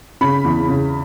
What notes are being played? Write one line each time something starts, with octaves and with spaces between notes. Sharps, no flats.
C#3 B5
E2
C#3